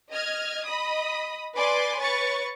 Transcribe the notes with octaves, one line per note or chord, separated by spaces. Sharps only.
D#5 F6 G#6
D#5 B5 D#6
B4 D5 G#5 C6 D6
B4 C#5 C#6 A6